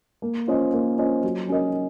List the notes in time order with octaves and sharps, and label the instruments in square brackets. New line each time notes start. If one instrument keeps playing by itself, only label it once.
[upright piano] A#3
C#4 F4 C5 D#5
A#3
C#4 F4 C5 D#5
F#3
C#4 F#4 A#4 D#5